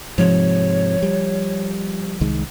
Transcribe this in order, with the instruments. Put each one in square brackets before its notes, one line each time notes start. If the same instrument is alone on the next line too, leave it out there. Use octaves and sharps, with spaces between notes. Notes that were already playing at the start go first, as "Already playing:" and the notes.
[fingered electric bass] G#2 C3 [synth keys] F3 [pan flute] C#5
[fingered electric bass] G3
C2 D#3 G#3